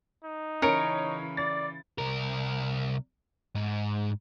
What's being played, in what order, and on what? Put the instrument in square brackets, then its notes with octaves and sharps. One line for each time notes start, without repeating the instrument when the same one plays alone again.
[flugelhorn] D#4
[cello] C#3 E3 [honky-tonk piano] C#4 C#7 D7 [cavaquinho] A#4
[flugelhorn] D5 [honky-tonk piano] A6
[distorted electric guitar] C2 A#4
G#2